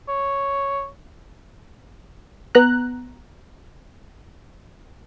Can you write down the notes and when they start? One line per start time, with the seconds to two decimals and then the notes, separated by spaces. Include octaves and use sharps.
0.08 C#5
2.55 B3 A#5 F#6